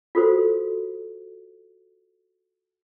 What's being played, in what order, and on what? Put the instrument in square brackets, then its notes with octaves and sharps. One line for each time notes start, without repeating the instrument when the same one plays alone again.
[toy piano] F4 F#4 A4 A#4 C5